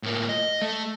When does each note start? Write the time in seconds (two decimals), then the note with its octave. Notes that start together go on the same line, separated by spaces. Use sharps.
0.03 A2 A#3
0.29 D#5
0.62 A3